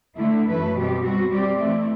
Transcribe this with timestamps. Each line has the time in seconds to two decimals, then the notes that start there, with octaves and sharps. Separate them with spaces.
0.17 D3 A3 E4
0.46 F#2 E3 A3 E4 B4
0.74 B2 G3 C4 G4
1.02 G3 C4 F#4
1.30 G3 C4 G4 D5
1.59 E3 A3 C4 E4